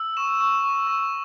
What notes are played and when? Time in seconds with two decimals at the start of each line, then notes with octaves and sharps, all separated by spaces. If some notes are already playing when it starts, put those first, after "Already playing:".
Already playing: E6
0.17 C#6 E7
0.41 C#6
0.64 C#6
0.87 C#6